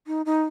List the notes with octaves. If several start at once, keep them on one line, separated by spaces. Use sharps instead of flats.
D#4
D#4